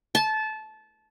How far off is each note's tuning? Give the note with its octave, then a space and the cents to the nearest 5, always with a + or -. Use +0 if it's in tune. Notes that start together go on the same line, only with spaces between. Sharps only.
A5 -20